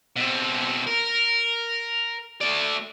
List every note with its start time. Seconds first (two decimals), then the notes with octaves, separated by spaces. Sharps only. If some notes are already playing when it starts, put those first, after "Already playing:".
0.16 B2 C4
0.87 A#4
2.41 A3 D5